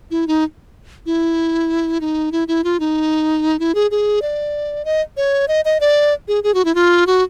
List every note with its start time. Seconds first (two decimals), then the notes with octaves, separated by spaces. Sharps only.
0.11 E4
0.27 D#4
1.06 E4
2.01 D#4
2.32 E4
2.48 E4
2.64 F4
2.80 D#4
3.59 E4
3.75 G#4
3.91 G#4
4.22 D5
4.85 D#5
5.17 C#5
5.48 D#5
5.65 D#5
5.80 D5
6.28 G#4
6.44 G#4
6.54 F#4
6.65 E4
6.75 F4
7.07 F#4